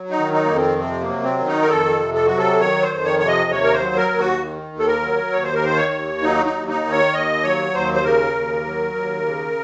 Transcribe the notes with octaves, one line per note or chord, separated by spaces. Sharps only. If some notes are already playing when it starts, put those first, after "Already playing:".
Already playing: F#3
D#4
D#3
D#4
F2 A#3
C4
C3 C4
A#3
F#3
C4
D#3
D#4
A#4
F2 A4
C3
A4
F#3 F#4
A4
D#3 C#5
C5
F2
C#5
C3 C#5
D#5
D#2 C#5
A#4
C5
F#3
A#4
D#2
F#4
D#3
D#2
A4
A#4
F#3
D#2 C#5
C5
A#4
D#3 C5
C#5
D#2
F#3 D#4
D#4
D#2
D#4
D#3
C#5
D#2 D#5
F#3 C#5
D#2 C5
C5
C#3 A#4
D#2
F#3
D#2
C#3